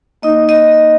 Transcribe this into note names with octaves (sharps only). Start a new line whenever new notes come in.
A#3 D#4 D#5
D#5